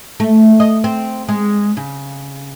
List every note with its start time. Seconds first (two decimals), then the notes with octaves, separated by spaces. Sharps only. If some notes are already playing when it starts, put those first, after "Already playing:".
0.20 A3
0.60 D#5
0.84 C4
1.29 G#3
1.77 C#3